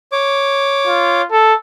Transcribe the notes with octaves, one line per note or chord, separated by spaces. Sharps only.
C#5 D6
F4
A4